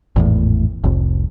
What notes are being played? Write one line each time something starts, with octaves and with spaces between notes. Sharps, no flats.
G#1 E2 A2
F1 C2